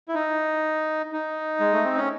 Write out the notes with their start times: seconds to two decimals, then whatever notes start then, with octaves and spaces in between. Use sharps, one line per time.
0.09 E4
0.15 D#4
1.13 D#4
1.60 G#3
1.73 A3
1.85 C4
1.97 C#4